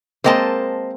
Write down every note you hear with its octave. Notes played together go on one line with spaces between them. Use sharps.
G#3 A#3 C4 C5 D#5 A5